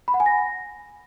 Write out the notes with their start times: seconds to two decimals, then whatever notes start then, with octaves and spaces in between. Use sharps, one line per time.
0.08 B5
0.14 F#5
0.20 G#5
0.26 A#6